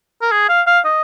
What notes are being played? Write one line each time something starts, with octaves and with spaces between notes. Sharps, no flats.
A#4
G#4
F5
F5
D#5